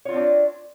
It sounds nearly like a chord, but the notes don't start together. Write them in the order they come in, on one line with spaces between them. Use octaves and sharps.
C#5 F4 C4 D4